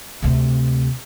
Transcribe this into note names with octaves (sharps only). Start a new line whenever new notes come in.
D2 C3